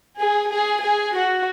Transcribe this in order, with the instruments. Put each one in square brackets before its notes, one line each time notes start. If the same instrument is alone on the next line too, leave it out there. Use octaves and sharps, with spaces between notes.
[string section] G#4
G#4
G#4
F#4